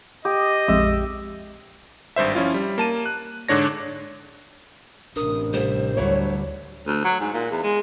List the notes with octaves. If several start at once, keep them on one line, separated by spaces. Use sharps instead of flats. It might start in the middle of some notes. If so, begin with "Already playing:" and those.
G4 D#5 D#6
A#1 F2 G#3 E5
G#1 G2 C5 E5
F3 C#4 E4 F4
G3
A#3 A5 D#7
F#6
G#2 D3 D4 C#5 A#6
A1 C3 D4 A#4 D#6
G3 C5 E5
D2 D3 F#3 G3 E4 C#5
D2
F#3
G#2
A#2
E2
G#3